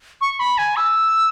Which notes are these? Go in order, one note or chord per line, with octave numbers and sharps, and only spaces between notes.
C#6
B5
G#5
E6